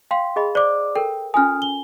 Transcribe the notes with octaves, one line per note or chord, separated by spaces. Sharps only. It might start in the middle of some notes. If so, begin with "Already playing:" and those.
F5 G5 C6
G#4 D#5 B5
C5 D5 D6
A4 A#4 G5
C#4 F4 G#5 D#6 F6
G7